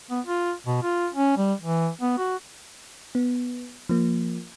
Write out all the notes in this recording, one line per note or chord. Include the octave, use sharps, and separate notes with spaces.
B3
F4
B2
F4
C#4
G3
E3
B3
F#4
B3
F3 A#3